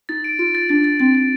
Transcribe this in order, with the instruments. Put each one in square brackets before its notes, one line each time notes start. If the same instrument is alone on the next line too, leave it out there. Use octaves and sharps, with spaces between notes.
[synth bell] D#4 [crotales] A6
[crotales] D7
[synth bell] F4 [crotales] D7
[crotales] A6
[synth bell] D4 [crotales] A6
[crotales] A6
[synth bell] C4 [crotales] A6
[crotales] A6